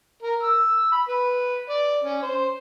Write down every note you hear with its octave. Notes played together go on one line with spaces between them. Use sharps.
A#4
E6
B5
B4
D5
C#4
C5